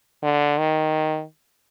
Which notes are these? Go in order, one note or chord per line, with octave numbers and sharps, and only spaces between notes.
D3
D#3